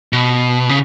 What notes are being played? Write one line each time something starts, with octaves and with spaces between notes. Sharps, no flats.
B2
C#3